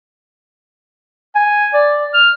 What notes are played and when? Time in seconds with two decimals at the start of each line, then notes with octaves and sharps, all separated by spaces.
1.35 G#5
1.74 D5
2.14 F6